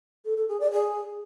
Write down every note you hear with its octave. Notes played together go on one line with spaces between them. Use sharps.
A4
A4
G#4
D5
G#4